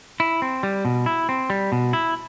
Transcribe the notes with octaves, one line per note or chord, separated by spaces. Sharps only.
E4
C4
G3
B2
E4
C4
G3
B2
E4